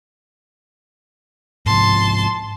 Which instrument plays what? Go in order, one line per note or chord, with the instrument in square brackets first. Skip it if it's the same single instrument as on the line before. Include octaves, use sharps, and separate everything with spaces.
[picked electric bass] G#2 C3 F3 [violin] A5 C6